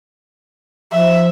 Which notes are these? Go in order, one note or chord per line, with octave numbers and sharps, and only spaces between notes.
F3 E5